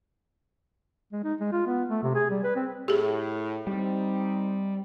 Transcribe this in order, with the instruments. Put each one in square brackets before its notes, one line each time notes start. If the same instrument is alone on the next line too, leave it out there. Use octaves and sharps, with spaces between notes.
[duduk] G#3
D#4
G#3
F4
B3
A3
C3
G#4
G3
B4
C4
[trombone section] A2 [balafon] G4 G#4
[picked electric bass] G3 [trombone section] C4 D#4